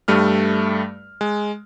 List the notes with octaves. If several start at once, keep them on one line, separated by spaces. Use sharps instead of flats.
G2 G3 A3 F6
G#3